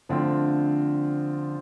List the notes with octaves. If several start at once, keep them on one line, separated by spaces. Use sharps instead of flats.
D3 F3 A3 C4 F4